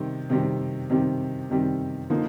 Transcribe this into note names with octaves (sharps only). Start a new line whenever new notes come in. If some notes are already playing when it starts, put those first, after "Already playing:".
Already playing: C3 D#3 G3 C4
C3 D#3 G3 C4
C3 D#3 G3 C4
C3 D#3 G3 C4
D3 F3 A#3 D#4